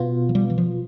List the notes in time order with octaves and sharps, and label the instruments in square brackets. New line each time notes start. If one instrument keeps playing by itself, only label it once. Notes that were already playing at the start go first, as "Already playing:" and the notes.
Already playing: [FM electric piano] B2 B3 F4
[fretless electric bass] F3
G3
E3
F3